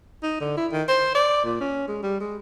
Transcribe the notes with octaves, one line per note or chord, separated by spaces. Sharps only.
D#4
D3
E4
D#3
C5
D5
A#2
C#4
G#3
G3
G#3